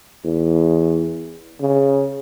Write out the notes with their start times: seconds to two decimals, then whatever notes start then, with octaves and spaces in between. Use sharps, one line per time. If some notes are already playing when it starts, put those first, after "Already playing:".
0.25 E2
1.61 C#3